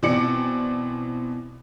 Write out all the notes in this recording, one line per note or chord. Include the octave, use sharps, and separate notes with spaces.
B2 E3 C4 D5 D6 C#7